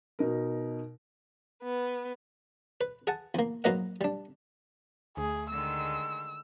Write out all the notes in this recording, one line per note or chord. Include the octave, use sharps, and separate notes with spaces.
B2 D#4 A#4
B3
B4
G#4 F#5 A5
E2 A#3
G#2 F#3 A#3 B4 D#5 F#5
G3 D4
D2 A3 G#4
D3 D#3 G#3 E6